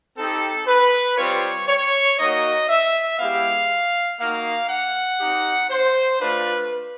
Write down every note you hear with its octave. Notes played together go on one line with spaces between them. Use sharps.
C4 D#4 G4 A4
B4
G3 C4 F4 C#5
C#5
A#3 D#4 F#4 D#5
E5
G#3 B3 E4 G4 F5
A#3 D#4 F#4 F5
F#5
C4 D#4 G4
C5
A3 D4 F4 B4